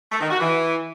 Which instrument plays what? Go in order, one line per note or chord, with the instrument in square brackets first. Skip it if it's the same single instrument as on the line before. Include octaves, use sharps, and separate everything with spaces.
[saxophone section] A3
D#3
F#4
E3